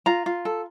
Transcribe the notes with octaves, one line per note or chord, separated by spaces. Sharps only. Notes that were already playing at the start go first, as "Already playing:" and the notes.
F4 A#5
F4
A4